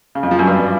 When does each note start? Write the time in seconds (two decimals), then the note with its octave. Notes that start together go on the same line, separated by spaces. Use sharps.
0.15 C#3
0.23 F2
0.31 F3
0.39 F#2
0.47 G2